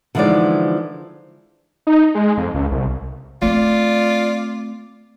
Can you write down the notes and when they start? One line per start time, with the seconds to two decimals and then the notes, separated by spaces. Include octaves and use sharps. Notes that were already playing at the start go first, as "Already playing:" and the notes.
0.15 D3 E3 F3 G#3 D#4 D5
1.87 D#4
2.15 G#3
2.37 F2
2.55 C#2
2.72 C2
3.42 A3 C4 F4 D5